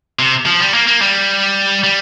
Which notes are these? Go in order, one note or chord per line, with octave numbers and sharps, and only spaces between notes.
C3
F3
G3
A#3
A#3
G3
G3